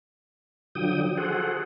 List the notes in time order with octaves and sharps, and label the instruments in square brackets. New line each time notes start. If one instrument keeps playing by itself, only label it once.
[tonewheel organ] D3 F3 F#3 G5 D#6
F#4 G#4 A4 C5 F#5